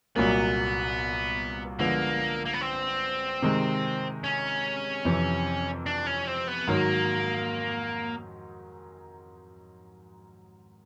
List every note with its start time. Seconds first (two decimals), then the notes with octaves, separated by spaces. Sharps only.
0.16 C2 A#2 F#3 A#3 B3
1.79 D3 F3 G#3 A#3 B3
2.46 A#3
2.53 B3
2.61 C4
3.42 C3 D#3 G#3
4.24 C#4
5.05 F2 C3 E3
5.86 D4
6.07 C#4
6.27 C4
6.47 B3
6.67 G#2 D#3 F#3 A#3